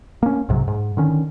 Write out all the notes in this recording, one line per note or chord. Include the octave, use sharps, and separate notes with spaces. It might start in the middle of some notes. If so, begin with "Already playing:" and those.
A#3 C#4
B1 G#2 C3 F#3
G#2
D3 D#3 C#4